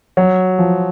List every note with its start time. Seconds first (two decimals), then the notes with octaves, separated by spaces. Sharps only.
0.17 F#3
0.59 F3